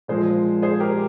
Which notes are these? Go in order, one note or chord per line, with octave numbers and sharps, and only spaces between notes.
A#2 F3 G#3 G#4 C5
G#4 C5
G4 A#4